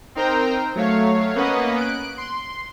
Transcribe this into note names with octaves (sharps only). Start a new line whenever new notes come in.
C4 D#4 A#4 C5 G5 A#5
F#3 A3 C#5 F5
A#3 B3 C#4 B4 D#5 F#5
F#6 D7
C6